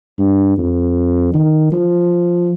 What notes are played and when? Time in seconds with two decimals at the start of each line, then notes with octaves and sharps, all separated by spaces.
0.19 G2
0.58 F2
1.34 D#3
1.72 F3